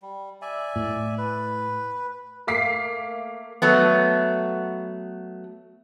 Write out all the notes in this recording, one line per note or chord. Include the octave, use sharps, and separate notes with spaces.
G3
D5 E5 G#5
A2
B4
A3 A#3 F5 D6 B6 C7
F#3 A3 B3